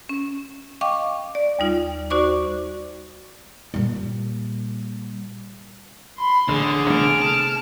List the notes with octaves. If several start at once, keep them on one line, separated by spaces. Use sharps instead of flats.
C#4
D#5 F5 G5 C#6 D6
D5
D#2 G3 D#4 F4
D#4 F#4 C5 D5 C#6 D6
A#2 G3
B5 C6
A1 D3 G#4
C3 A3 B3 F6 D7
A5